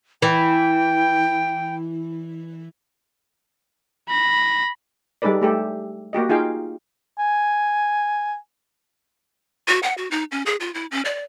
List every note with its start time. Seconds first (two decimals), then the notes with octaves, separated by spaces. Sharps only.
0.22 E3 G5
4.09 B5 A#6
5.22 G3 G#3 D#4 A4 B4 D5
5.41 A3 G4 A4
6.13 A#3 F#4 G4 D#5
6.29 D#4 F4 G#4 F5 G5
7.18 G#5
9.68 F#4
9.83 F#5
9.97 F#4
10.11 D#4
10.31 C#4
10.46 G#4
10.60 F4
10.74 E4
10.91 C#4
11.05 D5